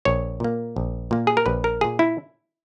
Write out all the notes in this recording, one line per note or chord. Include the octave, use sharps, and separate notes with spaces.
A#1 C#5
A#2 A#3
A#1
A#2 A#3
G#4
A#4
A#1 B4
A#4
A#2 A#3 G#4
E4